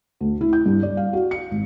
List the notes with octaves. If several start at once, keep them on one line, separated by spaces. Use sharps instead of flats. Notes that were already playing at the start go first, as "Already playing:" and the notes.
D2
E4
G6
G2
D5
F5
F#4
C#7
G#1